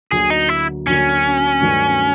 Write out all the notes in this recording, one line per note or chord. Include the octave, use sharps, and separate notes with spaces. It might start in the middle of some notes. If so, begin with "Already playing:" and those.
D2 D3 F#3 A#3 G#4
D#4
E4
D2 D3 F#3 A#3 C#4
G2 D#3 F#3 A3